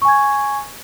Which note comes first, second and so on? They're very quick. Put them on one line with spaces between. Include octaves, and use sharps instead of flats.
C#6 G#5 G#6